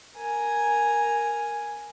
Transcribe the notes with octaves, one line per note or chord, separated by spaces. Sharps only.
A#4 G#5